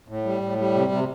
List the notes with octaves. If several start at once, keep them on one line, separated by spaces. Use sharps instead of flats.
A2
G3
A2
G3
C3
C3